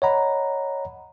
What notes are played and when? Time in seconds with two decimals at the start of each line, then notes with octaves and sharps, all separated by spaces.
0.02 C#5 D#5 F#5 A#5 B5